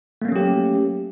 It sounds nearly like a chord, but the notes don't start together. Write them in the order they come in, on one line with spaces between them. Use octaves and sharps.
A3 A#3 C#4 F#3 G4